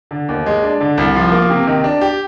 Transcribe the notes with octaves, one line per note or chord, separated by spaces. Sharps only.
D3
D#2
G#3
D4
D3
C2
F3
A#3
C3
D#3
D4
G4